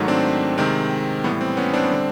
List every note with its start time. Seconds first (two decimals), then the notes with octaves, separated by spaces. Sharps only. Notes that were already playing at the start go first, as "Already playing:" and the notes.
Already playing: G#2 D#3 F#3 A3
0.08 C4 D4
0.58 C3 D#3 G#3 C4
1.24 A2 E3 G3 B3
1.41 C4
1.57 B3 C#4
1.73 C4 D4
1.90 D3 G3